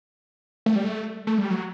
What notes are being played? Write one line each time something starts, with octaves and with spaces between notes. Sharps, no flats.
A3
G3
A3
A3
G3
F#3